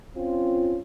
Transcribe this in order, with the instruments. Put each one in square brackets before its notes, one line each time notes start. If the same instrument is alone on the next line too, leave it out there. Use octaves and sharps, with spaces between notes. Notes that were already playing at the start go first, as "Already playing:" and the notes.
[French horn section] C4 C#4 F4